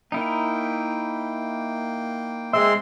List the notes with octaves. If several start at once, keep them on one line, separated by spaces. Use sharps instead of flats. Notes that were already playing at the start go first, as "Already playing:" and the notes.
A#3 D#4 E4 A#4 G5
G#3 C4 E5 C6 E6